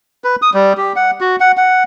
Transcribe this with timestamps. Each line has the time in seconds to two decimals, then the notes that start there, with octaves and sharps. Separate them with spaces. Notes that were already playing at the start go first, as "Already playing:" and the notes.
0.24 B4
0.42 D#6
0.54 G3
0.77 G4
0.96 F#5
1.21 F#4
1.40 F#5
1.57 F#5